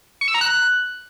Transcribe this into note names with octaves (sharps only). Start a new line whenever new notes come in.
C#6
E6
A#5
F#6